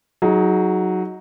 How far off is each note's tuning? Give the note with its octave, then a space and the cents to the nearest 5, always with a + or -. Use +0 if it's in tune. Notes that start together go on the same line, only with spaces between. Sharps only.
F#3 +0 D#4 +20 G#4 +20